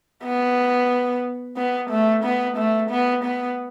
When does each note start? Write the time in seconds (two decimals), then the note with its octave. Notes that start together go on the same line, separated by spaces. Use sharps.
0.23 B3
1.57 B3
1.90 A3
2.24 B3
2.57 A3
2.90 B3
3.24 B3